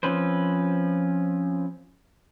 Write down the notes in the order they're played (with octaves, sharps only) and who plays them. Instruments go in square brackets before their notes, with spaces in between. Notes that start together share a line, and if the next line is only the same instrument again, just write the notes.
[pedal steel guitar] F3 C4 C#4 B4 C5